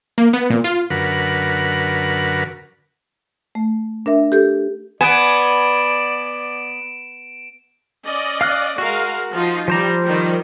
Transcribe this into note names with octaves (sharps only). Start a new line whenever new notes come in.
A#3
B3
A#2
F4
F#2 D3 A#4 B4 F#5
A3
D4 A#4 E5
G4 A4 G6
B3 D5 G#5 D7 E7
C#4 D5 D#5
F5 F6 F#6
G#3 F#4 A#4 F5
F3 D#4 F4
F3 G3 C5 A#5
D#3 G3